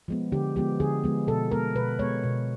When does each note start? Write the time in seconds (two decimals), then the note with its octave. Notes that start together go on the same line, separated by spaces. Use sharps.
0.08 F3 G#3 B3
0.32 D3 G4
0.56 F3 G#3 B3 G4
0.80 D3 G#4
1.04 F3 G#3 B3
1.27 B2 A4
1.51 G#3 B3 A#4
1.75 B2 B4
1.99 G#3 B3 C#5
2.24 B2